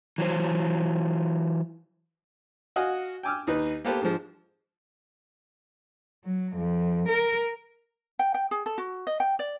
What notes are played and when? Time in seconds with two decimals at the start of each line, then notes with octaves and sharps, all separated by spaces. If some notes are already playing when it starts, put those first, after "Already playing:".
0.18 E3 F#3 C5
2.76 F#4 D#5 F5 F#5 G#5
3.23 G5 G#5 D6 E6 F6
3.47 D#2 D#4 B4
3.85 A#3 B3 G4 A4 B4 C5
4.02 G#2 D3 F3 G#3
6.25 F#3
6.56 F2
7.08 A#4
8.19 G5
8.34 G5
8.51 G#4
8.66 A4
8.78 F#4
9.07 D#5
9.20 G5
9.39 D5